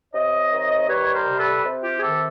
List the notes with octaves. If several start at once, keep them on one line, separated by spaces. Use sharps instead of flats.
C3 C#5 D#5
D#3
G3 B4 C#5
A#4 C5
C3
A4 B4
C3
F4 G4
G#4
D#3 G4 A4